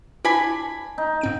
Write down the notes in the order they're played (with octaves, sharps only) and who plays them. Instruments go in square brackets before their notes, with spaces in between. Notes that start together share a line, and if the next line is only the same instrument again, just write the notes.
[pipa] D4 G#5 B5 [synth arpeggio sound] E4
[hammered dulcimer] D#4
[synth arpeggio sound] G#2 C4 D7